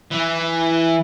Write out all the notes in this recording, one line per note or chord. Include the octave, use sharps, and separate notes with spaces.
E3